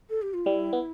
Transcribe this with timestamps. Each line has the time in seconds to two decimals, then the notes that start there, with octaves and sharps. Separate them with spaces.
0.10 A4
0.22 G4
0.34 F4
0.45 G3 E4
0.73 B3